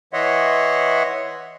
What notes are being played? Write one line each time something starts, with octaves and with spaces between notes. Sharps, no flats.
E3 C#5 D#5 E5 F#5 C6